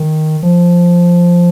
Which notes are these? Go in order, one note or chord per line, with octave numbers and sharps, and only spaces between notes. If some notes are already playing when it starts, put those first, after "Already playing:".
Already playing: D#3
F3